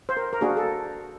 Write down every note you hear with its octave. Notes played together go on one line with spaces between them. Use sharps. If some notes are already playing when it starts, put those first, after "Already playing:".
C5
A#4
A#4
A#3 D4 F#4 G#4
A4